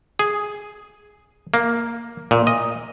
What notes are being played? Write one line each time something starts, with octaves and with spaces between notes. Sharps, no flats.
G#4
A#3
A#2
D#5